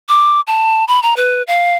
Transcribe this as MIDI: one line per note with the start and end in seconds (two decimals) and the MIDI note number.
0.09 0.41 86
0.47 0.85 81
0.88 1.00 83
1.03 1.14 82
1.17 1.43 71
1.47 1.77 77